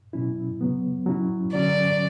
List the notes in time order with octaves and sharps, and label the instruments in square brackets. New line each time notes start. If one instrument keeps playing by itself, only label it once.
[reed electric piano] B2 F#3 C#4 E4
C#3 F#3 B3
F#3 C#4 E4
[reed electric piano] D3 F#3 C#4 F#4 [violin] D5